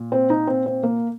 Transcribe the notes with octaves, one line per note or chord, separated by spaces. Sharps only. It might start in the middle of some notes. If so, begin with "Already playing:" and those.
Already playing: A#2
C4
D#4
C4
C4
A#3